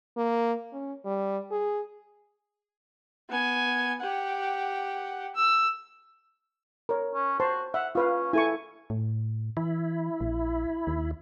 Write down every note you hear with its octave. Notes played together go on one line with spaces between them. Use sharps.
A#3
C#4
G3
G#4
B3 G#5
G4 F#5
E6
A#4 C#5
C#4
F#4 C5 A5 C6
E5 F#5
C#4 F4 B4 F5
E4 A4 G#5 C#6
A2
E3 E4
A#1
D#2